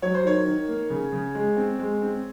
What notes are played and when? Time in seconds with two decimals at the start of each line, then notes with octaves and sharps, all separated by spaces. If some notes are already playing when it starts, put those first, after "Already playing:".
0.02 F#3 C#5
0.14 C5
0.24 D#3 C#5
0.46 D#3
0.68 A#3
0.90 C#3
1.12 C#3
1.35 G#3
1.57 C4
1.79 G#3
2.02 C4